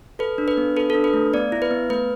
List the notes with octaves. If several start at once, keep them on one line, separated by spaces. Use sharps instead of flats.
A4 B4
D4
B4
B3
A4 B4
D4 A4
B4
A3
B3 D5
E4
B4
B3
A3 B4